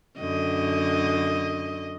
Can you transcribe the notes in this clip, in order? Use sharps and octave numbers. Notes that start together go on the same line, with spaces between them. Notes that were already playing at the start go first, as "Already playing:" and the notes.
F#2 D3 D#5